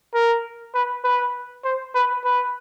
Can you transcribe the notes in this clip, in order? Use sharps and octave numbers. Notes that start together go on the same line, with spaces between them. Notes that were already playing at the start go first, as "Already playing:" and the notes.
A#4
B4
B4
C5
B4
B4